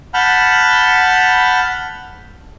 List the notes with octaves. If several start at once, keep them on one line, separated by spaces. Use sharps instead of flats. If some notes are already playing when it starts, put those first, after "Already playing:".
F#5 A5 B5 F6 G6